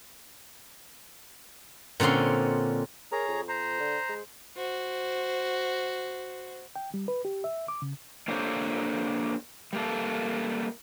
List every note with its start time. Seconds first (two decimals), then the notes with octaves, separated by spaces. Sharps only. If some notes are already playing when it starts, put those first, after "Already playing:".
2.00 A#2 D3 C4 C#4 C6
3.12 G#4 A#4 C#5 A#5
3.28 F2
3.49 C5 A#5
3.80 D3
4.09 G#3
4.57 F#4 C5
6.76 G5
6.94 G3
7.08 B4
7.25 G4
7.44 E5
7.68 D6
7.82 C#3
8.28 A#3 D4 G4 A4 C5 C#5
9.73 G3 A#3 A4